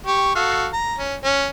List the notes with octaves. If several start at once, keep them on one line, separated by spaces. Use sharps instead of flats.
G4 C#6
F#4 A4 F5
A#5
C#4
C#4